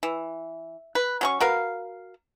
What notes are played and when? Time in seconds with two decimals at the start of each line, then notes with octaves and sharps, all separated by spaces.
0.03 E3
0.95 B4
1.21 F#3 C#4 C#6
1.40 F#4 A#4 B4 F5